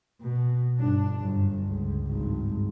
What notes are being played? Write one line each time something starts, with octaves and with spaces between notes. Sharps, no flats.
B2
G1 D4
G1 F#2
C#2
G#1 G2